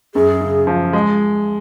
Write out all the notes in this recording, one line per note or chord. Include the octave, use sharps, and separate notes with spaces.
F#2 G#4
C#3
F3
G#3